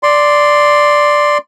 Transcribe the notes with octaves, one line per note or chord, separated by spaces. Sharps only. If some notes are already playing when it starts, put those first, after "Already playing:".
D5 C6